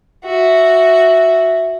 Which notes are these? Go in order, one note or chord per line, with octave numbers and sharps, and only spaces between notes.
F#4 E5